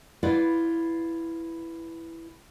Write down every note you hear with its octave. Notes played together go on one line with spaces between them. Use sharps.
E4 F4 B4 D5 F#5